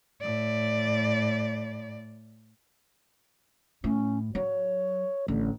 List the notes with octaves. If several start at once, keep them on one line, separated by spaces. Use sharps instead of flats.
A2 D5
A2 C#4
F#3 C#5
A1 D3